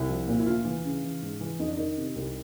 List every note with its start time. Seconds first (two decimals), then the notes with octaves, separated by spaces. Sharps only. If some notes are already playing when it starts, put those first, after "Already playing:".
Already playing: C2 E4
0.08 F3
0.28 A#2
0.39 E4
0.46 D2 F4
0.65 E3
0.84 C#3
1.04 E3
1.22 G#2
1.41 E3
1.59 F2 D#4
1.68 D4
1.77 D#3 D#4
1.97 C3
2.16 C2